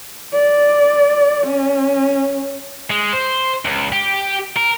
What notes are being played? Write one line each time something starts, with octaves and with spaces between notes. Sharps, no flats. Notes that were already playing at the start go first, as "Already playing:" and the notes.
D5
C#4
G#3
C5
C#2
G4
A#4